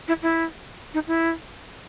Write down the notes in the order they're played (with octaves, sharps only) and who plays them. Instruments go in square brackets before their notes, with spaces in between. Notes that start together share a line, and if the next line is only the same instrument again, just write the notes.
[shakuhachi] E4
E4
D#4
E4